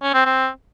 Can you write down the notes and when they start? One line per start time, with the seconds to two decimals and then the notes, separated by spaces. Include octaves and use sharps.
0.02 C#4
0.14 C4
0.25 C4